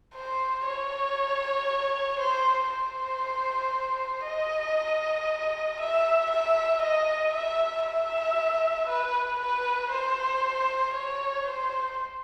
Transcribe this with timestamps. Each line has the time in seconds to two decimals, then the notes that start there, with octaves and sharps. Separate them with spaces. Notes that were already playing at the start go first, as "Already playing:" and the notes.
0.14 C5
0.65 C#5
2.20 C5
2.71 C5
4.25 D#5
5.80 E5
6.31 E5
6.82 D#5
7.33 E5
7.85 E5
8.88 B4
9.40 B4
9.91 C5
10.94 C#5
11.45 C5